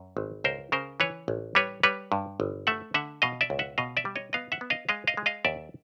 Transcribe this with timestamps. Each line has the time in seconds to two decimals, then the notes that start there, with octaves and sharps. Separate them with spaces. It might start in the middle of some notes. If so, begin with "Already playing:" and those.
Already playing: F#2
0.17 G#1
0.44 C#2 A#4 C5
0.72 C#3 A#4 C5
1.00 E3 B4 C#5
1.28 A1
1.55 G3 B4 C#5
1.83 G3 B4 C#5
2.12 G2
2.40 G1
2.67 A3 E5 F#5
2.94 D3 E5 F#5
3.22 B2 D#5 F5
3.41 D5 E5
3.50 C#2
3.59 E5 F#5
3.78 B2 D#5 F5
3.97 D5 E5
4.05 G3
4.16 C#5 D#5
4.33 B3 D#5 F5
4.52 E5 F#5
4.61 B3
4.70 D#5 F5
4.89 G#3 D#5 F5
5.07 D#5 F5
5.17 G#3
5.26 D#5 F5
5.45 D#2 D5 E5